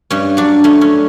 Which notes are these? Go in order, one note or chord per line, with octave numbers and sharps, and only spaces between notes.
G2 C#4
F#3 D4
A3 C#4
C#4